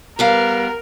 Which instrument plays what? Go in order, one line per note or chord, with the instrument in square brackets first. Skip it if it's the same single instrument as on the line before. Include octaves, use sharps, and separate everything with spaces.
[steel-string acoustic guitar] G3 B3 F5 [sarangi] A#4